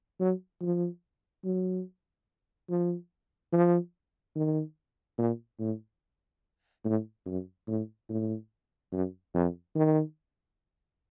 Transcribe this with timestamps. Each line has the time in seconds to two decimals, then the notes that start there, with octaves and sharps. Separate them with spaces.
0.20 F#3
0.61 F3
1.44 F#3
2.69 F3
3.52 F3
4.36 D#3
5.18 A#2
5.60 A2
6.85 A2
7.26 F#2
7.68 A2
8.09 A2
8.92 F#2
9.34 F2
9.75 D#3